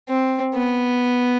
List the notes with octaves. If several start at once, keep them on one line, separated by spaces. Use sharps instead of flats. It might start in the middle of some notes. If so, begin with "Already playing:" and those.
C4
B3